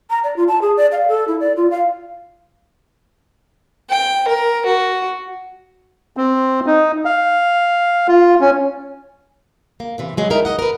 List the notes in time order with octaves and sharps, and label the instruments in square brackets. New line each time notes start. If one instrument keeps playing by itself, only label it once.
[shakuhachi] A#5
D5
F4
A5
G#4
D5
F5
A4
E4
D5
F4
F5
[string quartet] G5
A#4
F#4
[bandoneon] C4
D#4
F5
F4
C#4
[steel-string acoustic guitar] A#3
F#2 C3 E3
F#3 G#3 B3
D#4 E4 A#4 D5 E5 G5
D#5 F#5
A#4 B4